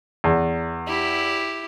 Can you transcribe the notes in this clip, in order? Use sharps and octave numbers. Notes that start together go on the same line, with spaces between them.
E2
E4 G4